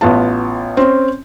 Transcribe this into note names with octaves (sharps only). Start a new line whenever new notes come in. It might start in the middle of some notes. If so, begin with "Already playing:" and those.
A1 B3 F4 A5
C4 C#4